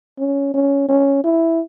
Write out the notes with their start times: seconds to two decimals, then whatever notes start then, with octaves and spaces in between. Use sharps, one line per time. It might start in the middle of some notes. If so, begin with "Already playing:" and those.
0.19 C#4
0.54 C#4
0.89 C#4
1.24 E4